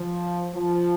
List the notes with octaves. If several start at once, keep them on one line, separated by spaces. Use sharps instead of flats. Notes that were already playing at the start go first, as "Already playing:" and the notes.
Already playing: F3
F3